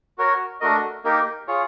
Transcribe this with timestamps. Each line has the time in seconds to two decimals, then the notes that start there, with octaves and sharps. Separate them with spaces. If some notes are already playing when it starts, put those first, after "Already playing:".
0.18 F#4 A#4 C#5
0.60 A3 D4 F#4 A#4 D#5
1.04 A#3 D#4 G4 A#4
1.48 F4 G#4 C#5